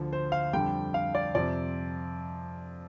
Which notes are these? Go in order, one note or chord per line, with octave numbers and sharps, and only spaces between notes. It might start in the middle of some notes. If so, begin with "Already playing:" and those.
Already playing: D2 D3 F3
C5
F5
F2 D3 G3 G5
F5
D5
F2 C3 F3 D5